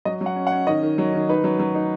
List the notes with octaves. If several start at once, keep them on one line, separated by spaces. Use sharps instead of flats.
F#3 D#5
F#3
F#5
C#4
F#5
C#4
D#3 D#5
D#3
F#3
D#3
D#4 B4
F#3
F#3
D#4